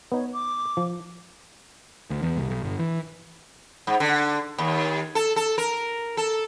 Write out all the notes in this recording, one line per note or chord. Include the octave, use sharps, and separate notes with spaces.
B3 D#4 C#5
D6
F3
D2
E2
C2
B1
G1
E3
G#2
D3
D#2
A4
A4
A#4
A4